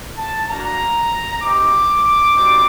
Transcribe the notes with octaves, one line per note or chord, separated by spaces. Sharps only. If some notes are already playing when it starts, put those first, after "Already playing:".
A5
A#3 D4 F#4 A#5
C4 D#4 G4 D6
G3 C4 D#4 F#4